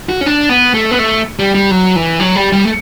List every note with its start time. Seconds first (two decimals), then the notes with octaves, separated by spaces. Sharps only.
0.09 F#4
0.21 C#4
0.26 D4
0.49 B3
0.74 A3
0.91 B3
0.99 A3
1.39 G3
1.55 G3
1.71 F#3
1.96 E3
2.20 F#3
2.36 G3
2.52 G3
2.65 A3